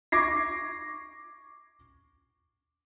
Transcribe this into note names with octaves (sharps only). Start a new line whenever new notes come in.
C#6 D6 G#6 A#6 C7